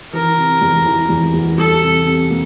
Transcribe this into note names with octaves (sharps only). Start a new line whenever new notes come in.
E3 A#4
C3
E2
E3
E2
E2
G3 A4
C3
C3
A#3